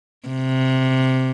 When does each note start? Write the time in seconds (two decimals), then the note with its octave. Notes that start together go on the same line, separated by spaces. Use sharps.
0.28 C3